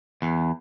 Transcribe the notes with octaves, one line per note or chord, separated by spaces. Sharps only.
E2